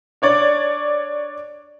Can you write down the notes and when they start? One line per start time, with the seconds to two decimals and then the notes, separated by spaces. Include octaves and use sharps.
0.22 D4 C#5 D5